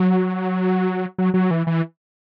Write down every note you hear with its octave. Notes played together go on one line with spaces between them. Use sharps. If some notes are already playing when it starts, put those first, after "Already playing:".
Already playing: F#3
F#3
F#3
E3
E3